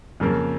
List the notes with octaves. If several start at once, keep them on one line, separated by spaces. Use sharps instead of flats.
F2 C#3 F3 A#3